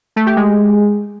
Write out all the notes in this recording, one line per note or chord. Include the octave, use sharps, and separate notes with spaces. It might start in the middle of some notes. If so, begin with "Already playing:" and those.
A3
G4
G#3